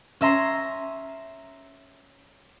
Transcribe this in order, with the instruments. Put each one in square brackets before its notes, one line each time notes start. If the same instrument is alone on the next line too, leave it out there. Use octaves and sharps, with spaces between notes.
[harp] C#4 E5 A#5 C6